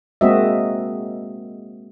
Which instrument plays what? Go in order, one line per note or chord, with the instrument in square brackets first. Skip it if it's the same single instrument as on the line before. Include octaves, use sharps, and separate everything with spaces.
[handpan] G#3 A#3 C4 F#4 D#5 E5